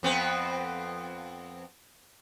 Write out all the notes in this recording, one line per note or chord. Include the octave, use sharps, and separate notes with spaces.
F2 B3 C4